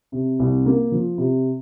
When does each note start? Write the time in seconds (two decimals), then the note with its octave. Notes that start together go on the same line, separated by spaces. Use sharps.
0.12 C3
0.40 C2
0.66 A#3
0.92 F3
1.18 C3